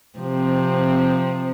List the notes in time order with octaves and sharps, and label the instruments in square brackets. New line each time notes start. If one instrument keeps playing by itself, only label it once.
[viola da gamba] C3 F3 C4